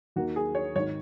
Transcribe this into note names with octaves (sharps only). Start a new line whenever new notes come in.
D#2 D#3 A#3 F#4
G#4
C#5
G#1 D#3 C#5